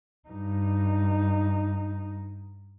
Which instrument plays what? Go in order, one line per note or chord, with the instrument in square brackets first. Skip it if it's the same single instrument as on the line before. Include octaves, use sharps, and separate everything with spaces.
[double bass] G2 D#4